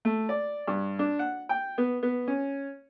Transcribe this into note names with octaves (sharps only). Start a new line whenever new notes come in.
A3
D5
G2
D4
F#5
G5
B3
B3
C#4